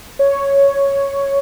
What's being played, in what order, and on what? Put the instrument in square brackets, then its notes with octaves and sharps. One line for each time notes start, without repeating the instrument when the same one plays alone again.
[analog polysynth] C#5